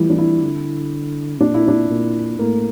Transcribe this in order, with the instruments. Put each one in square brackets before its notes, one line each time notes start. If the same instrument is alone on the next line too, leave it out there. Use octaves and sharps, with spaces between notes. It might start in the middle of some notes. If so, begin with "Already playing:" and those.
Already playing: [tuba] E3 [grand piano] F3 G3 A3 E4
[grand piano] D4
E4
[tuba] D3
[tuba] A#2 [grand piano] D4
[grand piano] E4
D4
[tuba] A#2
[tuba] A2 [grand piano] A#3